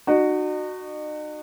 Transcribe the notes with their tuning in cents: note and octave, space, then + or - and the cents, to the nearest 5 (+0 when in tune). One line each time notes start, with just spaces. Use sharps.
D#4 -40 F#4 +0